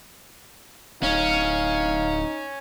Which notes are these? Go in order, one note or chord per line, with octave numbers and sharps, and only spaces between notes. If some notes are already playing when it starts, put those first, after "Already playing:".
D1 C#4 D#4 F5